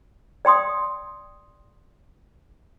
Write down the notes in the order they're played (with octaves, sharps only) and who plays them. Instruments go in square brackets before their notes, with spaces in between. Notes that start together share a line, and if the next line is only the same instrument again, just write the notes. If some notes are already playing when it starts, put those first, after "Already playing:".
[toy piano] D5 G5 C6 D#6